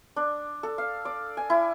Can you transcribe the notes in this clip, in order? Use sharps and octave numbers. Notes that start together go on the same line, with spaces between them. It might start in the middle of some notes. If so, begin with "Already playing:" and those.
D4
A4
F5
D5
G#5
E4